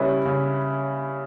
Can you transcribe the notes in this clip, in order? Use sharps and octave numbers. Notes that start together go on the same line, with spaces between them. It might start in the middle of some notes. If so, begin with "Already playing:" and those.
Already playing: C#3 G3 C#4 E4 B4
C#3